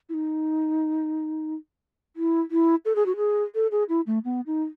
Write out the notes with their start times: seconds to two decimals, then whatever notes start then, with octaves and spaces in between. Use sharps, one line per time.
0.09 E4
0.14 D#4
2.16 E4
2.51 E4
2.85 A4
2.96 G#4
3.06 F#4
3.17 G#4
3.55 A4
3.72 G#4
3.89 E4
4.07 A3
4.25 B3
4.46 D#4